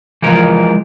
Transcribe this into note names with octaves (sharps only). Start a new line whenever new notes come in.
E3 F3 G#3 A#4